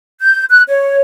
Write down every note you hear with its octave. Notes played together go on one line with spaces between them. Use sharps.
G6
F#6
C#5